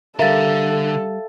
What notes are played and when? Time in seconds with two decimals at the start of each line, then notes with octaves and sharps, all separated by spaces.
0.19 D3 G3 A4 A#4 E5 F5 A6